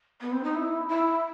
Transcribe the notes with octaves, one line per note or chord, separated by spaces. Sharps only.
B3
C4
D#4
E4
E4